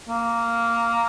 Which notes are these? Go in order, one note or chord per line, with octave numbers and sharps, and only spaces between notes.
A#3